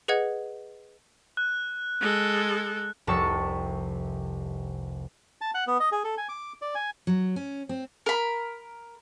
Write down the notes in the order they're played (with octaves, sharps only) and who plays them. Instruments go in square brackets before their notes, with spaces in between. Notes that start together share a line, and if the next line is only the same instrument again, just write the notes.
[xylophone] G#4 B4 D#5 F#5 G#6
[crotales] F#6
[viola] G#3 A4
[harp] F1 C2 C3 A5 C#6 E6
[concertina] A5
F#5
B3
D#5
G#4
A4
G#5
D6
D5
G#5
[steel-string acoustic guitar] F#3
C#4
C4
[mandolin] A#4 B5